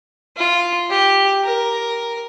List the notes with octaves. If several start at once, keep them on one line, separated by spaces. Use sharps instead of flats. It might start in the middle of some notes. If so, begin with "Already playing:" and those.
F4
G4
A#4